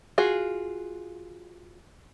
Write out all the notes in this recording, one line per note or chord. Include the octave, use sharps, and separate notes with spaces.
F4 F#4 G#4